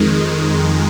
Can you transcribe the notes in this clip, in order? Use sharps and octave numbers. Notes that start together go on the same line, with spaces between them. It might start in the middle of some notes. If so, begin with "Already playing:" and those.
Already playing: F2 D#3 G#3